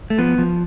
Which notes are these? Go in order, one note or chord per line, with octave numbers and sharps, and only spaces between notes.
A3
F3 B3
F3